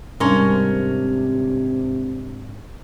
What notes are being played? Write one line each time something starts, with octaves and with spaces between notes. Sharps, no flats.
G#2 C3 G3 C#4 D4 G#4 A#4 C6